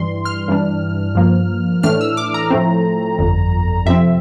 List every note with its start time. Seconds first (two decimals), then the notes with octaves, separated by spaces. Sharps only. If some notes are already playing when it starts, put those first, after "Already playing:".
Already playing: G2 E3 G3 C6
0.25 F6
0.48 G2 E3 G3 D4
1.15 G2 F3 A#3
1.83 A2 E3 A3 D4 F6
2.01 E6
2.17 D6
2.34 A#5
2.50 A2 F3 A3 C4
3.19 G1 F2 D3
3.86 F2 C3 F3 C4 E5